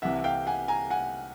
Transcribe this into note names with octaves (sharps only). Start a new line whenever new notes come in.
C2 C3 E3 E5 F#5
F5 G5
F#5 G#5
G#5 A#5
F#5 G#5